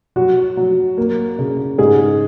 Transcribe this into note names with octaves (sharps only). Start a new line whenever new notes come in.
F#3 F#4
F#3
A#3
C#3
G#2 G#4